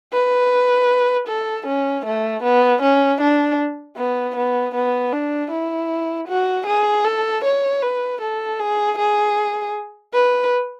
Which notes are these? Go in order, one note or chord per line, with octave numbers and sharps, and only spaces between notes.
B4
A4
C#4
A3
B3
C#4
D4
B3
B3
B3
D4
E4
F#4
G#4
A4
C#5
B4
A4
G#4
G#4
B4